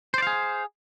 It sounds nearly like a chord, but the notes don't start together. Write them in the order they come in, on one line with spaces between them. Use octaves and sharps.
C5 D5 F5 G#4